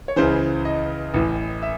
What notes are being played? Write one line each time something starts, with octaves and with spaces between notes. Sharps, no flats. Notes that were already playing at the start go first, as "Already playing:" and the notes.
C#5
C#2 C#3 E3 C5
D#5
A1 A2 E3
E5